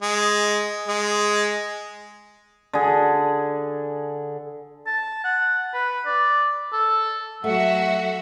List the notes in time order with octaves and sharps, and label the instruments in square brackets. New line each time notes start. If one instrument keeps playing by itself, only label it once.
[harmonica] G#3
G#3
[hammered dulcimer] D3 G#4
[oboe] A5
F#5
B4
D5
A4
[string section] F#3 F#4 E5 [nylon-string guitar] A3 [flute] F#5